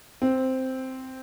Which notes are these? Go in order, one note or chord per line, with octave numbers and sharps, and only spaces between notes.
C4